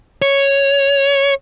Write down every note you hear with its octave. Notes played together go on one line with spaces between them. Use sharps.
C#5